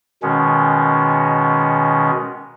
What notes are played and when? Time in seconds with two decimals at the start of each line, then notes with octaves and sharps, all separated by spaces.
0.23 B2 D#3 G#3 C#4